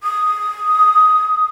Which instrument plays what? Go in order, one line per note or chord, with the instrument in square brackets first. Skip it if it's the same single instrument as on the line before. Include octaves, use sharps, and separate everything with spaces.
[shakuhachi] D#6